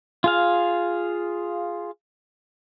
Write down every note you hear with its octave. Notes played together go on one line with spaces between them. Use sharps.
F4 G#4 F5